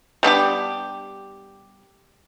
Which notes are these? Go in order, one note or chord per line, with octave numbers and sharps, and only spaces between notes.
G3 B3 D4 G4